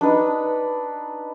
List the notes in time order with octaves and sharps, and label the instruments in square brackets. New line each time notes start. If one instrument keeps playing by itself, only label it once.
[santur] D4 D#4 B4